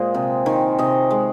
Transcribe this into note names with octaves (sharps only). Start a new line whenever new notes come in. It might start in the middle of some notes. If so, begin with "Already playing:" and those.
Already playing: A#2 G#3 C5 D#5
C3
D#3
C3 D#5
G#3